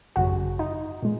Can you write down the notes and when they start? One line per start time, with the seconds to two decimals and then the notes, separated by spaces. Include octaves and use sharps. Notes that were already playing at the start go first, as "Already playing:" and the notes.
0.16 G#1 F#2 C#3 F#3 F#4
0.59 D#4
1.02 A#2 G#3